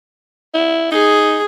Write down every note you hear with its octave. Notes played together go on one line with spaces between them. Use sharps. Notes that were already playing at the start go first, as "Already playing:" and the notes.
E4
D#4 G#4